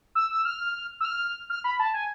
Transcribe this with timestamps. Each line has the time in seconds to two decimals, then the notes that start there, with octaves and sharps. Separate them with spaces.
0.15 E6
0.30 E6
0.45 F6
1.00 E6
1.05 F6
1.50 F6
1.64 B5
1.79 A5
1.94 G#5